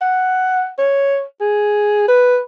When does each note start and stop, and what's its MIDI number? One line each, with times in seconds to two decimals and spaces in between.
0.01 0.68 78
0.78 1.23 73
1.41 2.08 68
2.08 2.39 71